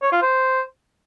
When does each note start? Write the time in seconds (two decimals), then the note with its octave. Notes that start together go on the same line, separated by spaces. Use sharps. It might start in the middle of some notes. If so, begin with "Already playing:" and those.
0.02 C#5
0.12 F4
0.22 C5